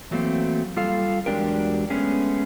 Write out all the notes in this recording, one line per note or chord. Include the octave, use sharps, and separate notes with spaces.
E3 F#3 A3 A#3 C4
G3 F4 A4 F5
E2 F#3 G#3 D4 G4 A#4
G#3 A3 B3 C#4 G#4